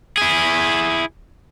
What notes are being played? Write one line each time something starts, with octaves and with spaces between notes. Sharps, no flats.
E4 G#4